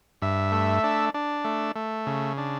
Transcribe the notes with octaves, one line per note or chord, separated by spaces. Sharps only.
G2 E5
A3
D4
D4
A3
A3
C#3
D4